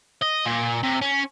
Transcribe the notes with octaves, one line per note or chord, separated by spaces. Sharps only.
D#5
A#2
C3
C#4